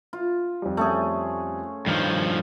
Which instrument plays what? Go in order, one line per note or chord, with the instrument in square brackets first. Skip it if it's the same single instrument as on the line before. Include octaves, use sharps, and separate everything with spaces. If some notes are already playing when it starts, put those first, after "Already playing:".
[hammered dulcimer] F4
[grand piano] F2 G3
[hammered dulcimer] A3 C#4 G#4
[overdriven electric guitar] G2 F3 [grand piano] D#3